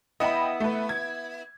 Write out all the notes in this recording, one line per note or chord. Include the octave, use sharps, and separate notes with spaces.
B3 E4 D#5 G5 B5
A3 B4
G#6